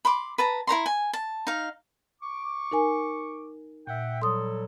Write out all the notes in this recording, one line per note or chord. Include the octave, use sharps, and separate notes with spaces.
B5 C6 D6
B4 A5 A#5
E4 C5 A#5 C6
G#5
A5
D#4 F5
C#6 D6
D#4 A#4 G#5
A#2 E5 F#5 G5
F#3 G3 A4 C6 D#6